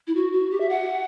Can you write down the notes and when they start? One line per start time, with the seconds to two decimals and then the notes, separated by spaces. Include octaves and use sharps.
0.07 E4
0.15 F#4
0.32 F#4
0.51 G4
0.60 E5
0.69 F#5